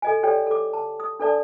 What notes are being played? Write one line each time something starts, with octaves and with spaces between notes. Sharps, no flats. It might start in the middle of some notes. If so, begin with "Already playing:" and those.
A4 D#5 G#5
G4 A4 C#5 D5 G5
A4 D6
A5
D#6
D4 A4 D5 A5